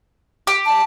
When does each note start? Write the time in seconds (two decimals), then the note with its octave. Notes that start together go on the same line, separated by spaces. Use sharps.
0.47 G4
0.66 A5